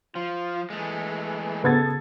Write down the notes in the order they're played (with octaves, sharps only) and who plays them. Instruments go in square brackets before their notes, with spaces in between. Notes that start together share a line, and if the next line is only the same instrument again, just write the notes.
[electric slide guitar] F3 [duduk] F4
[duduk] E3 [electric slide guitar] G#3 A3
[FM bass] C#3 [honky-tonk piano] B3 G#6 A6 [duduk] A4